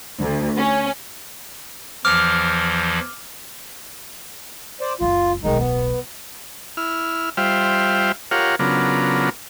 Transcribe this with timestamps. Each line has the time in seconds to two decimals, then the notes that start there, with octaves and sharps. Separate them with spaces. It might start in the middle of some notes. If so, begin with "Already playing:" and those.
0.21 D2
0.57 C#4
2.05 E2 E3 F3 D6 F6
4.81 C5 D5
5.01 F#1 C#2 F4
5.44 D1 B1 D#3 G#3 D#4
5.58 B3
6.77 E4 F6
7.37 G3 F4 C5 E5 F5 G5
8.31 F4 G4 A#4 C#5 F5 F#5
8.59 C#3 F#3 B3 D4 F4 A#4